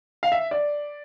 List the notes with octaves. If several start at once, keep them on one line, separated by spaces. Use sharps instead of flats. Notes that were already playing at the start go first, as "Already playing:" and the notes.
F5
E5
D5